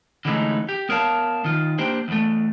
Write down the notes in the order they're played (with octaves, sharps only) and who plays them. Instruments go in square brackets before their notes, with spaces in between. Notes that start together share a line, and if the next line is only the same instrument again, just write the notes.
[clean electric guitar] D3 E3 G#3 A3 C#4 D#4
G4
B3 A#4 C#5 F5 A5
D#3 F4
A#3 D4 G4 C5 G5
E2 A3